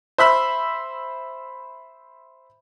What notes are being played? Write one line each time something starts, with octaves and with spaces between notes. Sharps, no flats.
C5 E5 B5 E6